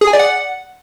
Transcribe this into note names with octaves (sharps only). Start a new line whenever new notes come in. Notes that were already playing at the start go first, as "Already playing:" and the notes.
G#4
G#5
D5
F#5